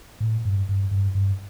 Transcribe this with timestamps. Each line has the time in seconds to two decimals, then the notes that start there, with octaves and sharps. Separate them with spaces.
0.21 A2
0.45 G2
0.69 G2
0.91 G2
1.15 G2